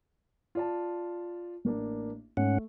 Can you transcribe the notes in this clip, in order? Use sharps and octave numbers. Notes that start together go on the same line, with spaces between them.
F4 D5 A5
A1 A#3 D4
G#2 A3 C#4 F#5